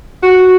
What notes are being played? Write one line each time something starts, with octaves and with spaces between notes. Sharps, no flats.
F#4